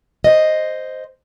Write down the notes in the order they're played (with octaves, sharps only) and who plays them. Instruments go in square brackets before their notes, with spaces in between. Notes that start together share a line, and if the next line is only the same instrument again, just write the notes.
[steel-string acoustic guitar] C5 D#5